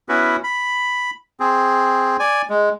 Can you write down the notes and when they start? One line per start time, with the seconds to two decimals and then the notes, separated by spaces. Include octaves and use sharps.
0.09 B3 C#4 E4 F#4 B4
0.44 B5
1.40 C4 G#4
2.20 D5 G#5
2.50 G#3